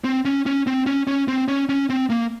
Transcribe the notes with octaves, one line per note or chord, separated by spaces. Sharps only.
C4
C#4
C#4
C4
C#4
C#4
C4
C#4
C#4
C4
A#3